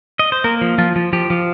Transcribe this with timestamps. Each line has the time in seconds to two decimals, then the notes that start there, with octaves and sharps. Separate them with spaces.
0.19 D#5
0.32 C5
0.44 A#3 A#4
0.61 F3
0.78 F3 F4
0.96 F3
1.13 F3 G4
1.30 F3